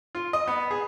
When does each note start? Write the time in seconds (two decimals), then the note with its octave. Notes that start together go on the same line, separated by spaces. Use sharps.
0.15 F4
0.33 D#5
0.47 B3
0.71 G#4